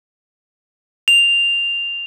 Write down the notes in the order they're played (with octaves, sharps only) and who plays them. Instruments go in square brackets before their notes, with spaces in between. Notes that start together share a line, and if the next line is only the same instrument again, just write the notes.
[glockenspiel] F7